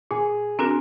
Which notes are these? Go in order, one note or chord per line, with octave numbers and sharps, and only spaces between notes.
A#2 G#4
C4 D4 F#4 A#4